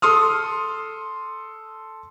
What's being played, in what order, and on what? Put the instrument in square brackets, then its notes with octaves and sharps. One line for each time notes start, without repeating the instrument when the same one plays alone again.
[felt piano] A4 C6 D#6 F6